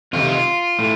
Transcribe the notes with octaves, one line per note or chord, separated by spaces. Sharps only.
F2 C3 D#3 F4
A2